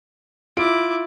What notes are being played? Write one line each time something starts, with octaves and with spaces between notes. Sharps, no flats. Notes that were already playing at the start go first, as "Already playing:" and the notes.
E4 F4 D6 D7